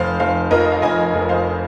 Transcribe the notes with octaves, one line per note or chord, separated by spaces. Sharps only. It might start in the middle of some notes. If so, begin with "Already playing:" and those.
Already playing: F1 C5 F5
F1 C5 F5
F2 A#4 D#5
F5
F1 D#5 G#5
F1
C5 F5